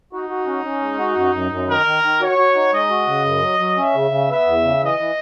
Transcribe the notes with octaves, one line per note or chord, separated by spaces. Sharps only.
D#4 F#4
F#4
C#4
C#4
G#3
F#4
F#2
F#2
F#2
D#3 A#4
D#3
D#3
F#4 C#5
F#4
D#4
G#3 D#5
F#4
C#3
F#2
F#3
F#3
C#4 E5
C#3
C#3
B3 E5
E2
C#3
E3 D#5
E3